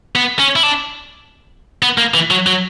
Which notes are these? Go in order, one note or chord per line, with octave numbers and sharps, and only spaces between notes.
B3
C#4
E4
D4
B3
A#3
E3
F#3
F#3